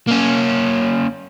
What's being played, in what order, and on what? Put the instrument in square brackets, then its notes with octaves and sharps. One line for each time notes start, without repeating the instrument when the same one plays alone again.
[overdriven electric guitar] A#3 C#4